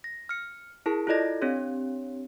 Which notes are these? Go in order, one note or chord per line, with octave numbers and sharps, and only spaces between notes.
A#6
F6 C#7
E4 G#4 A#4 A5
E4 F4 A4 D5 D#5 A#6
C4 D4 G4 C#5